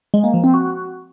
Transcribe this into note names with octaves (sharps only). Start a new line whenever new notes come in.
G#3
A#3
F3
C4
F#4